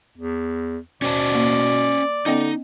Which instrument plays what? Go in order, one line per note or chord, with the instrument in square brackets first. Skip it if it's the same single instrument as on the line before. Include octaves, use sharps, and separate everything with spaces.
[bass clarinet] E2
[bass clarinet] B2 [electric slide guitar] C#4 C5 A5 [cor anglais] D5
[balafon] A#3
[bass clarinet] D3 [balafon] B3 C#4 D#5 [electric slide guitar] D#4